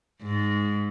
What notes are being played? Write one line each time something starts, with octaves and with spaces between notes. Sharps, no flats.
G#2